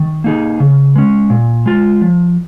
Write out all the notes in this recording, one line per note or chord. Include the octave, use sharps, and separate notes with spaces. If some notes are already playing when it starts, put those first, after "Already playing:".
Already playing: D#3
A#3 D#4 G#4
C#3
G#3 C#4
A#2
G#3 F4
F3